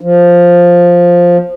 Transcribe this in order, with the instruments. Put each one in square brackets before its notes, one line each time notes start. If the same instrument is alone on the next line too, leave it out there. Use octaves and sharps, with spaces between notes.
[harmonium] F3